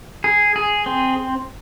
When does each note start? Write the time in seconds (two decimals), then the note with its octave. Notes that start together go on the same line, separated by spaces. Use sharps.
0.24 G#4
0.56 G#4
0.86 C4